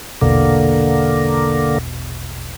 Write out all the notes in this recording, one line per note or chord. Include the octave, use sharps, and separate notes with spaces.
A#1 E2 B2 D3 A#3